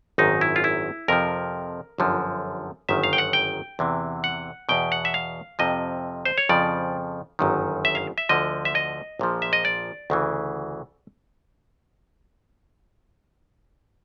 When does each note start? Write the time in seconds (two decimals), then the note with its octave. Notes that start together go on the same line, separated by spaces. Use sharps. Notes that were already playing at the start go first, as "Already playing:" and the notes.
0.18 G#1 F#2 D#3 D#4
0.41 E4
0.56 F4
0.64 E4
1.08 F2 C3 F3 A#4
1.98 G1 F#2 D3 F3
2.89 G1 F#2 D#3 E5
3.04 F5
3.13 G5
3.18 F#5
3.33 G5
3.79 E2 C3 E3
4.24 F#5
4.69 E2 B2 G5
4.92 F#5
5.05 E5
5.14 F5
5.59 F2 C3 F3 D#5
6.25 C5
6.38 C#5
6.49 F2 C#3 F3 D5
7.39 G1 F#2 D#3
7.85 E5
7.95 F5
8.18 E5
8.29 D2 D3 F3 D#5
8.65 E5
8.75 D#5
9.19 A#1 A#2 F3
9.42 E5
9.53 D#5
9.65 D5
10.10 D2 C#3 E3